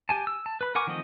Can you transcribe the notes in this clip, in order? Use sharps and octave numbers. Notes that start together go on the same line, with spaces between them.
G4 G#5 A5
E6
A5
B4 B5
A#4 F#5 G#5 C#6 D6
D#3 F3 A3 C4 D#5